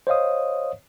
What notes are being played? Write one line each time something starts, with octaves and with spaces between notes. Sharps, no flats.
C5 C#5 D#5 F5 D#6